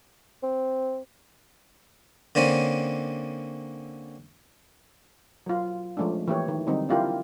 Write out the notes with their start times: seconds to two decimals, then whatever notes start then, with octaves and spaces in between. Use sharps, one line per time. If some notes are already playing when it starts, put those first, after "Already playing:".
0.43 C4
2.35 D3 A#3 C4 C#4
5.46 F#3 F4
5.97 F3 G#3 A3 C#4 D4
6.28 E3 A#3 E4 G4 C#5
6.48 D#3
6.67 D3 F#3 G3 C4 D#4
6.89 D4 E4 F4 G4 A#4